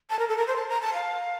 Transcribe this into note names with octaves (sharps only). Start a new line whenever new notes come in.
A5
A#4
A4
A#4
C5
A5
A#5
A5
F5